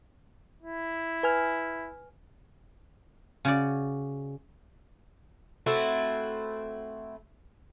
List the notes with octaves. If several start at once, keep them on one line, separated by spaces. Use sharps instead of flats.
E4
B4 G#5 F6
C#3 F#4 D5
A3 C4 E4 F#4